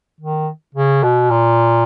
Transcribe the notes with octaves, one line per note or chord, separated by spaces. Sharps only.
D#3
C#3
B2
A#2